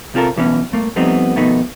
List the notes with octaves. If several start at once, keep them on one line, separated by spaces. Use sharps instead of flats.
C3 C4 F4 A4 A#4
B1 E3 B3 C#4
G2 A3 A#3
F3 G3 A3 B3 C4 D#4
F2 B2 D#3 A3 B3 D#4